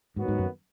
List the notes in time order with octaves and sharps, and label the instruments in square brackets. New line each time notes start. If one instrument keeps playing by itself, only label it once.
[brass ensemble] D#2 D#3 F#3 B3 F#4 [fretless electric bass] G#2
[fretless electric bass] G#2
F#2